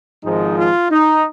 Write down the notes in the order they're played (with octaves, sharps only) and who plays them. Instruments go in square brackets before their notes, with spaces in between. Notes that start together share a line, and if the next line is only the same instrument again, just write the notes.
[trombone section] G#1 G#2 F3 G#3 D#4
F4
D#4